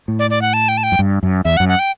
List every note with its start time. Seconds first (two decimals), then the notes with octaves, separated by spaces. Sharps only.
0.08 A2
0.19 D5
0.30 D5
0.42 F#5
0.54 A5
0.68 G5
0.77 A5
0.83 G5
0.92 F#2
0.99 G2
1.23 F#2
1.45 E2 E5
1.57 F#5
1.60 F#2
1.68 F#5
1.79 G5